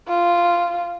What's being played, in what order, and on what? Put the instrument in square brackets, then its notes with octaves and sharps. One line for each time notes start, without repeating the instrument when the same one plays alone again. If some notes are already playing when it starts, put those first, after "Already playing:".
[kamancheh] F4